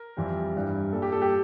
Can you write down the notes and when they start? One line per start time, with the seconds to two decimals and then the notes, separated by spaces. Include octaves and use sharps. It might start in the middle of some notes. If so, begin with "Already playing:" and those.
Already playing: A#4
0.17 F2 E3 G3
0.54 G2 E3 G3
0.92 A#2 G3 A4
1.02 G4
1.12 A4
1.22 G4